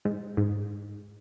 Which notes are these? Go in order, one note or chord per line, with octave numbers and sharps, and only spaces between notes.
G#2
G#2